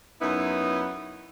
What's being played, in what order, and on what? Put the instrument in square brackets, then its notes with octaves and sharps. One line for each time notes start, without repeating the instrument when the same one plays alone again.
[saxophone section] F#2 B3 D#4 E4